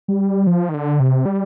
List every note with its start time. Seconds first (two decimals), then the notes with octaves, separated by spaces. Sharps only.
0.08 G3
0.47 F3
0.69 D#3
0.74 D3
1.00 C3
1.26 G3